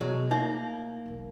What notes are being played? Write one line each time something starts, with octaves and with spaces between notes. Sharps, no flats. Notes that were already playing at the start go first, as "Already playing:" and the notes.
B1 B2 F#3 G#3
A3 A#3 D#4 F4 E5
E1 B1